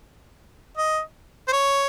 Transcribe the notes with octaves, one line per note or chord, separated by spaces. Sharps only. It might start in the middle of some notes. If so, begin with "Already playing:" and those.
D#5
C5
C#5